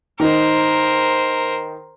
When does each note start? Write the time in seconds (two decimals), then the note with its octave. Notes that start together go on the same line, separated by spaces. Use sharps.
0.20 D#3 D#4 A#4 C5